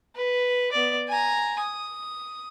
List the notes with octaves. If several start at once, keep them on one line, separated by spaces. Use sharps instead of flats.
B4
B3 D5
G#5 A#5
D#6